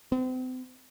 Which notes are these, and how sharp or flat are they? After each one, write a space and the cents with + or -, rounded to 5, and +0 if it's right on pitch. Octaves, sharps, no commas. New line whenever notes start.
C4 -40